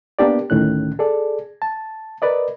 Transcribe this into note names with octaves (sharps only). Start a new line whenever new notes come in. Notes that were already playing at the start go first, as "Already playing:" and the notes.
A#3 B3 D4 G4 D5
D2 A2 D#3 C#4 F#6
G#4 A4 D5
A5
A#4 B4 D5 D#5